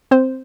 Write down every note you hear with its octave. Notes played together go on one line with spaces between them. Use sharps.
C4 C5